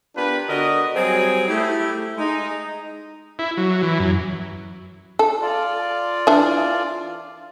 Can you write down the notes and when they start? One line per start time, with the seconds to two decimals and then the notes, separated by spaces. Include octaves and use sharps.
0.16 B3 D4 F4 G4 A#4 B4
0.48 D3 F#4 A#4 D5 D#5
0.96 F#3 G3 C4 G#4
1.48 A3 E4 G4
2.17 G#3 D#4
3.39 E4
3.57 F#3
3.83 E3
4.00 F#2
5.19 A4
5.42 F4 D5
6.27 E3 D4